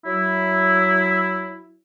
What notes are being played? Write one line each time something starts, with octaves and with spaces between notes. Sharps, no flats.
F#3 E4